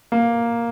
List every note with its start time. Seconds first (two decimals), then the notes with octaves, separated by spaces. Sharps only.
0.12 A#3